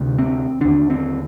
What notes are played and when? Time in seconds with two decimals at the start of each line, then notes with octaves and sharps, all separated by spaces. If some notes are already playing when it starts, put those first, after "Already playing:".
Already playing: D2 C3
0.18 C4
0.61 D#2 D3 D4
0.90 C4